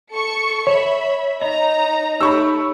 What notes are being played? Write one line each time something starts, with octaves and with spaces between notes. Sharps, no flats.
A4 C#6 C#7
C#5 E5 B5
D#4 D#5 A#5
A3 D#4 G4 C#5 B5 C#6 E6